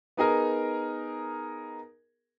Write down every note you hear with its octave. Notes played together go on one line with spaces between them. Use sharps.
B3 D#4 G#4 A#4